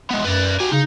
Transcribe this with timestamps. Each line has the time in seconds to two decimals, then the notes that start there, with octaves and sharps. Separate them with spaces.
0.11 G#3 B3
0.25 F#2 B4 D5
0.60 F#4 G4 G#5
0.72 C#3 D#4